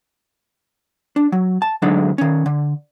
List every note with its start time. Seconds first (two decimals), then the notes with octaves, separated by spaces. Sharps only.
1.16 D4
1.32 F#3
1.62 A5
1.82 D2 F#3 G#3 A3 D4 D#4
2.18 D#3 C#4
2.46 D3